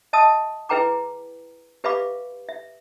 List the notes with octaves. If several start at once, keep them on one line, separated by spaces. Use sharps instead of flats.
D#5 E5 A5 D#6 E6
E4 G#4 B4 G5 A#5 D6
G4 B4 E5 F5 B5 D6
E5